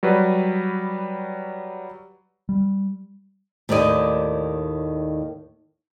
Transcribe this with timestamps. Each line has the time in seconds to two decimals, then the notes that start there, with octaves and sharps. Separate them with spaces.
0.03 F#3 G3 F#4 B4
2.49 G3
3.69 D#2 A2 D#3 D5 D#5